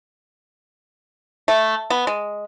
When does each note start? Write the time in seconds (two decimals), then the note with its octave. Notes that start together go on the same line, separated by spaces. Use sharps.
1.48 A3
1.90 B3
2.07 G#3